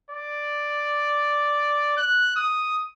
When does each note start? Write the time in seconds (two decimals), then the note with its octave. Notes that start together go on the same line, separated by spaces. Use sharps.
0.10 D5
1.97 F#6
2.36 D#6